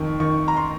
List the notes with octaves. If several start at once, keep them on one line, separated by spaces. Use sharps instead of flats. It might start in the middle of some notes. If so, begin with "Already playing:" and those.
Already playing: F2 D#3 C#6
D#3 C#6
A#5
C6